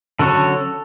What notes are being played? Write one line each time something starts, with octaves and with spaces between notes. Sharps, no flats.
D3 F#3 C#4 F#4 A4 C#5